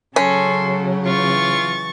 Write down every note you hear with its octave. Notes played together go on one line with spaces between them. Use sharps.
C#3 F#3 C#4 A4 C6
E3 F4 C#6 A6